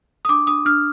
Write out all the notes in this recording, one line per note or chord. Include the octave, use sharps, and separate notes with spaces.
D#6
D4 D6
D4 D#6
D4 F6